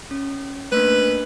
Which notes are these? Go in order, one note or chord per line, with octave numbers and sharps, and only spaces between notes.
C#4
A3 A#3 D4 B4